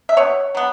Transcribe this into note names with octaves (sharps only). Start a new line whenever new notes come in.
E5
B2 C#5
F#3 B3